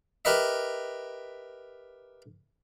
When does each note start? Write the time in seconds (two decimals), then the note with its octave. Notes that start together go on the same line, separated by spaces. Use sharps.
0.25 G4 A#4 B4 D#5 E5